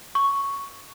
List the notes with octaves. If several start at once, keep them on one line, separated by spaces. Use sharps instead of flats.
C#6